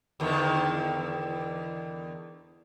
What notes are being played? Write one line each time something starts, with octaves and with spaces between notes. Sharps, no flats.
E2 D3 D#3